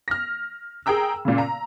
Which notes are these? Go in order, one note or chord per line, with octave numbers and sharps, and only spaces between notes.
F6 A#6
G#4 A#4 G5 A#5 E6
A#2 C#3
A#5